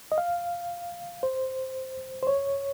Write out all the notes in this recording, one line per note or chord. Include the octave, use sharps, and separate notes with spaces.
D#5
F5
C5
C5
C#5